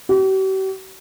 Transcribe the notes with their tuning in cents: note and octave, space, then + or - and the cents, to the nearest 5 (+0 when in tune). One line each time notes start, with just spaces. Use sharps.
G4 -45